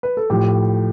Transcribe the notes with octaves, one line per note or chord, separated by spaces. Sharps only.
B4
A4
A2 F3 G4